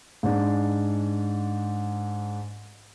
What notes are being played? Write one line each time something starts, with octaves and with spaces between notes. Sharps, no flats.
G#2 D4